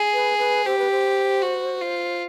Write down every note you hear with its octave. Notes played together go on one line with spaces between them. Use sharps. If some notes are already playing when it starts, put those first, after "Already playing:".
Already playing: G#4
B4
B4
G4 C5
B4
C5
F#4
F4